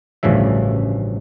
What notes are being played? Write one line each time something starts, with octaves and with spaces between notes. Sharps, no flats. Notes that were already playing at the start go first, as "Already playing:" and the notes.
A1 D2 G2 C#3 F3 E5